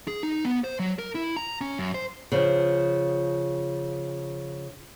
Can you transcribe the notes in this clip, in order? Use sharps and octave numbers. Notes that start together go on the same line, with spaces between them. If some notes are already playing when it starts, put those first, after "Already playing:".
G#4
D#4
B3
C5
F#3
A#4
E4
A#5
C#4
F#2
C5
C#3 F3